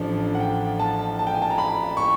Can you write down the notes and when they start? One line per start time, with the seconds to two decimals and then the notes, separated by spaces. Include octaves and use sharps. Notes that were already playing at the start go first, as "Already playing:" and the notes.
Already playing: A1 A2 F3 A3 D4 D5
0.35 F#5
0.40 G5
0.80 A5
1.19 A5
1.27 G5
1.34 G#5
1.42 A5
1.51 A#5
1.58 B5
1.97 C#6